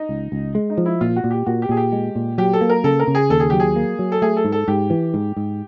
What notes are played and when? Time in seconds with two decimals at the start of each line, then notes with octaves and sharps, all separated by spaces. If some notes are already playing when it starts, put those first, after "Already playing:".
Already playing: D#4
0.09 C#2
0.32 C#2
0.55 G#3
0.70 D#4
0.78 F3
0.86 E4
1.01 A#2 F4
1.16 F#4
1.24 A#2
1.31 G4
1.46 A#2 F#4
1.62 G4
1.69 A#2 G#4
1.77 G4
1.92 G#3
2.15 A#2
2.38 F#3 G4
2.53 A4
2.61 A#3
2.70 A#4
2.84 C#3 A4
3.00 A#4
3.07 C#3
3.15 G#4
3.30 D#2 A4
3.40 G#4
3.50 F#3 G4
3.60 G#4
3.76 A#3
3.99 F#3
4.12 A4
4.22 A3 G#4
4.37 A4
4.45 G#2
4.52 A4
4.68 G#2 G4
4.90 E3
5.14 G#2
5.36 G#2